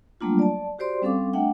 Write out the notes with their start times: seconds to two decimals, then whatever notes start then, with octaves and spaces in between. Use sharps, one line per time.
0.21 F#3 G3 A3 A#3 D4 F4
0.39 D5 A5
0.79 F#4 G4 C5 D5 C6
1.02 G3 C4 C#4 A4 F5 D6
1.33 A3 D4 E5 F#5 G5